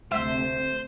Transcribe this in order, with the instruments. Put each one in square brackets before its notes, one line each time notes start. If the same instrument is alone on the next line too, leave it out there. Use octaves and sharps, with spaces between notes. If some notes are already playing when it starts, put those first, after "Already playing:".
[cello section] D2 C3 A3 [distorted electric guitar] C5 [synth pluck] E5